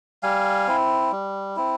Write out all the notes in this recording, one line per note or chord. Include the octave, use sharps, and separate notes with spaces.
G3 F5 G#5
C4 E4
G3
C4 E4